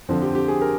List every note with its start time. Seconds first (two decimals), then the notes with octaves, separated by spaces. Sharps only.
0.09 F2 D3 F3 C4
0.22 G4
0.35 G4
0.48 G#4
0.62 A#4